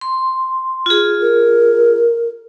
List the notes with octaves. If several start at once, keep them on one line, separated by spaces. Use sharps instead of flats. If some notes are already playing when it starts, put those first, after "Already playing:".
C6
F4 G#4
A#4